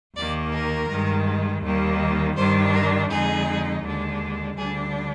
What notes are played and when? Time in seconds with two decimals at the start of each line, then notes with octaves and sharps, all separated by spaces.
0.16 D#2 D#3 A#3 D5
0.53 A#4
0.90 G2 D#3 G#3
1.63 D#2 D#3 G3 A#3
2.36 G2 D#3 G3 D4 C5
2.73 A#4
3.10 F2 D3 G#3 D#4 G#4
3.83 D#2 D3 G#3 D4
4.57 D2 D3 G3 D4 G#4